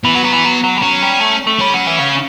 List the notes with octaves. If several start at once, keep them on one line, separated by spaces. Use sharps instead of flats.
E3 B3
F#3
F#3
E3
F#3
F#3
G3
F#3 C#4
G3
A3
A3
G3 C#4
F#3
E3
C#3